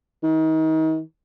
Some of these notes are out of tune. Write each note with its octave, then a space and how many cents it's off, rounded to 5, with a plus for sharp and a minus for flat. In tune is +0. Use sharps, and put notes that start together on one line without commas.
D#3 +35